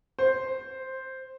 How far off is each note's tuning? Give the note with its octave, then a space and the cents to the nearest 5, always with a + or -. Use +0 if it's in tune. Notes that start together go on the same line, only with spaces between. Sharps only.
C5 +0